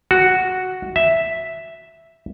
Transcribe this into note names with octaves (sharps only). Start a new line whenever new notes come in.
F#4
E5